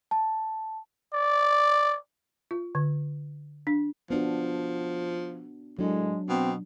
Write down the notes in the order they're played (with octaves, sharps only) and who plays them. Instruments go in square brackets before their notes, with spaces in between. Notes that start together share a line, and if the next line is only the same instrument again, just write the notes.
[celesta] A5
[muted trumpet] D5
[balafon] F4
D3
D4
[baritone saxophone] F3 [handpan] B3 D4 F#4
[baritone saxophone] A2 [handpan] F#3 D4 [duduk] G#3
[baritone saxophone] B2 [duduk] C4